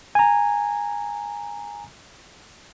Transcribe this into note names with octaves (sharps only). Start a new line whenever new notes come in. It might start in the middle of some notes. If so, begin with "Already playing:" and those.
G#5 A#5